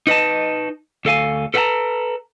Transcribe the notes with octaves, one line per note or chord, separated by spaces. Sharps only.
D#4 B4 D#5 A5
D2 A4 F5 G#5
A4 B4 F5 F#5 A5 A#5